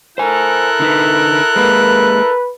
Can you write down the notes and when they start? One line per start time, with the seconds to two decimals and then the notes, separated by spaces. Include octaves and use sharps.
0.18 E4 A4 A#4 C5 G#5 F#6
0.80 D3 D#4 B4
1.56 G#3 A#3 B4